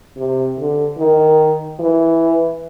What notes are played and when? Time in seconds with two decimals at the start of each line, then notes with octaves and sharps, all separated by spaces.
0.17 C3
0.58 D3
0.98 D#3
1.80 E3